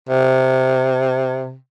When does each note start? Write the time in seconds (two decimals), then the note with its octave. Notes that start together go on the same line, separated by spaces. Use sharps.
0.09 C3